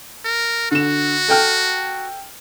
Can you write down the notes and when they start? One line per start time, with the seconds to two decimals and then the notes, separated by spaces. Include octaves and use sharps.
0.25 A#4
0.71 D3 F#4 E7
1.28 A4 G5 F6